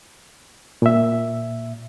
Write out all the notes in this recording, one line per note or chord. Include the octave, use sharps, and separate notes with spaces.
A#2 E5